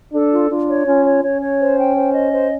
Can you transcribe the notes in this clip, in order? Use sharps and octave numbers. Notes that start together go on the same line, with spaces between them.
D4 A4
F4
D4 F4
C#5
C#4 F4
C#5
C#4 C#5
C#5
C5
G5
C5
D#5
C5